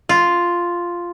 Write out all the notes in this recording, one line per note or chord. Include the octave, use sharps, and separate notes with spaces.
F4